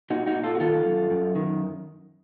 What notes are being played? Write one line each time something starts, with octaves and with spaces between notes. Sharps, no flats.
A#2 D#4 F#4
D#4 F#4
A#2
F4 A4
F#4
D#3 F4 A4
F#2
F#2
D#3